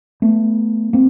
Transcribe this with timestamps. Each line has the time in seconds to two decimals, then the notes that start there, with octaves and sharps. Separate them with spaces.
0.22 A3 B3
0.93 A#3 C4